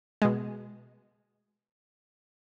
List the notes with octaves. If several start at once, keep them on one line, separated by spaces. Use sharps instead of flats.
B2 G#3